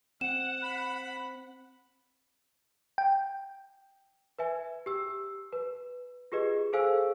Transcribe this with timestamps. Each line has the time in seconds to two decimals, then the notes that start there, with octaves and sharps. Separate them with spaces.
0.21 C4 F#5 E7
0.63 B5
2.98 G5
4.39 B4 E5 G#5
4.86 G4 E6
5.52 B4
6.32 F4 G4 G#4 B4 D#5
6.73 G#4 A4 C5 F5 G#5 E6